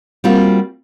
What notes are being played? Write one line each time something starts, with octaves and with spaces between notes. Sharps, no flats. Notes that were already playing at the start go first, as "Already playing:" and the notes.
G3 A#3 C4 F4 F#4